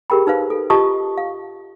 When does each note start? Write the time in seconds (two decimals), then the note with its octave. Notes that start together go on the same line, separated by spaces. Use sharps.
0.10 G4 G#4 A#4 G5 B5
0.27 D#4 B4 C5 F5
0.50 A4
0.70 F4 G4 D#5 A5 C#6 D#6
1.18 F5